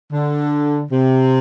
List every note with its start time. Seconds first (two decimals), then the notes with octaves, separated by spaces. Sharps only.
0.12 D3
0.92 C3